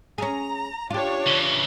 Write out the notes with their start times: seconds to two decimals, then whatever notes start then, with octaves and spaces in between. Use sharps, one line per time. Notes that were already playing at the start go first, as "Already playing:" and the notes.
0.18 C#4 G#4 A#5
0.90 D4 F4 G4 C#5
1.27 C#3 E3